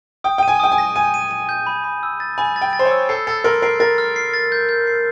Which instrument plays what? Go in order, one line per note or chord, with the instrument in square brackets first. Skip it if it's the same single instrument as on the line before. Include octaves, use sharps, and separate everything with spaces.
[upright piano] G5 [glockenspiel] D#6
[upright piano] G5 [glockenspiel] D#7
[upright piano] G#5
[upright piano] G5 [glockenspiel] D#6
[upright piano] G#5
[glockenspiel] A#6
[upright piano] G#5 [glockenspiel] D#7
[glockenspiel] D#7
D#7
G6
B5
B5
E6
A6
[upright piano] G#5 [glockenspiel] B5
[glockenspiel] A6
[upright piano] G5
[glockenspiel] A6
[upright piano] C5
C#5
[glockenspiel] E6
[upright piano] A4 [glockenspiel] C7
[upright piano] A4 [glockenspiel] A6
[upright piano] A#4 [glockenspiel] C6
[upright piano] A#4 [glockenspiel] C7
[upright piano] A#4 [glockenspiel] A6
[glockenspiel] F6
C7
A6
G6
G6
C7